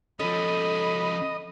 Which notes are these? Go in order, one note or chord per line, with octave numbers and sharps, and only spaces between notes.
F3 C#4 A4 D#5 B5